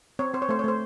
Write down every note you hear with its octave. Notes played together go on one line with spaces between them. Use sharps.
C4 C#5
C4 C5
C#5
A3 C5
C#5
A3 C5